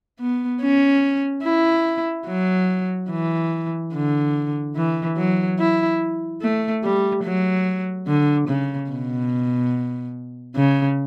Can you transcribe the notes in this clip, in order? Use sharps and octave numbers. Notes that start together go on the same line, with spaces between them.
B3
C#4
E4
F#3
E3
D3
E3
F#3
E4
A3
G3
F#3
D3
C#3
B2
C#3